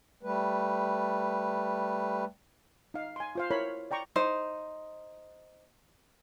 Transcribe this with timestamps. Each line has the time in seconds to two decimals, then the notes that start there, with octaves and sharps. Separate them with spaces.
0.23 G3 A3 B4
2.94 D#4 F5
3.16 G#5 C6
3.35 F4 C5 F5
3.51 E4 A#4 C#5 B5
3.91 D5 G5 A#5 C#6 D6
4.16 D#4 C5